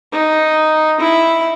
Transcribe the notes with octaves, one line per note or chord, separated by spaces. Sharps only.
D#4
E4